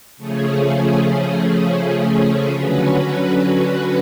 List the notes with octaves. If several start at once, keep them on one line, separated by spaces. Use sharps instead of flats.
C#3 F3 A3 C#4 G#4
D3 F#3 C#4 F#4 B4